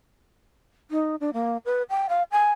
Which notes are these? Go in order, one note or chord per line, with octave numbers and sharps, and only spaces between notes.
D#4
D4
A#3
B4
G5
F5
G#5